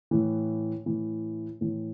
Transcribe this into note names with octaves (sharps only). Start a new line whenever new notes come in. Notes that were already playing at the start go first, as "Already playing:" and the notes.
A2 E3
A2 E3
A2 E3